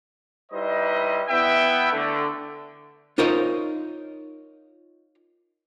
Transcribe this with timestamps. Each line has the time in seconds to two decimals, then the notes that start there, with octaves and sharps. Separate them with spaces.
0.52 G3 D#4 E4 B4 C5 D#5
1.29 B3 E4 E5 G5
1.92 D3 A3
3.18 D#4 F4 A#4 C5 C#5 D#5